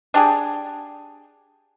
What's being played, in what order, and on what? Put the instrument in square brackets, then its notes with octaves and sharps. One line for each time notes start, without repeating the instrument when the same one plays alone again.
[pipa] D4 G4 G#4